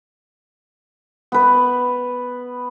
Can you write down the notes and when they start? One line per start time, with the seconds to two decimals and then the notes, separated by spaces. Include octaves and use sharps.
1.32 B3 B4